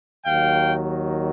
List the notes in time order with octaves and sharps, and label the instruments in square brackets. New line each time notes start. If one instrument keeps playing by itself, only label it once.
[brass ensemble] D#2 D#3 F#3 F5 G5